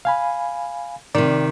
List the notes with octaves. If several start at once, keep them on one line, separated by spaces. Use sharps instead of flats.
F5 G#5 B5
C3 D#3 D5